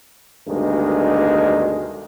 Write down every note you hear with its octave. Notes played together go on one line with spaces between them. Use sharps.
D2 G2 B2 D#3 G#3